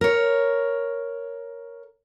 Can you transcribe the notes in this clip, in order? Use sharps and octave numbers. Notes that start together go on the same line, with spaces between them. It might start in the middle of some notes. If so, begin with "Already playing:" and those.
A#4 C#5